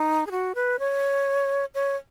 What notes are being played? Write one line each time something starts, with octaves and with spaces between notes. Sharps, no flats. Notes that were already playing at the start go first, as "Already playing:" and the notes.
Already playing: D#4
G#4
F#4
B4
C#5
C#5